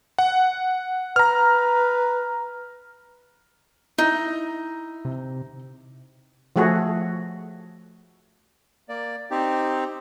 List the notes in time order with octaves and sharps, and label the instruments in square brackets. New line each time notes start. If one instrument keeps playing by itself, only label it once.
[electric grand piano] F#5
[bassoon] B4 [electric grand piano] A#5 F6
[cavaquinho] D#4 [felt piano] E4
[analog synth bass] C3
[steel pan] F3 A3 F#4 G#4
[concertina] A#3 D5
C4 D#4 G4